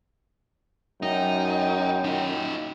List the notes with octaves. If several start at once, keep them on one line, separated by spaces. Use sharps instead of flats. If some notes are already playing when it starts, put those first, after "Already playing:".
F#2 D#4 G5
D#4 F4